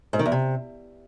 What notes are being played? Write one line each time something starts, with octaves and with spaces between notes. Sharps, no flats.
G#2
D#3
E2
C3